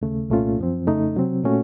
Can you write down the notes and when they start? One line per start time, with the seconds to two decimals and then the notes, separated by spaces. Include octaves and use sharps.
0.02 D#2 C#3 A3
0.30 C2 A#2 A3 C#4 F4
0.58 F#2 F3 C4
0.87 F2 C#3 A3 D#4
1.16 C3 F#3 C4
1.44 A#2 A3 C#4 F#4